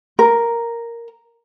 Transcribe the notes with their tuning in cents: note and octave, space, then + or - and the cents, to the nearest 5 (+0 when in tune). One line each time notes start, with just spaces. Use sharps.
A#4 +0